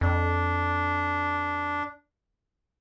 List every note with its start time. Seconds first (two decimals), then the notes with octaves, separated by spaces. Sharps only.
0.01 F2 D4